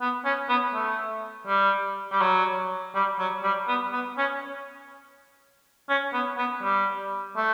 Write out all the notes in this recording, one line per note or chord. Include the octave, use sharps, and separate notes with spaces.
B3
C#4
B3
A3
G3
G3
F#3
G3
F#3
G3
B3
B3
C#4
C#4
B3
B3
G3
A3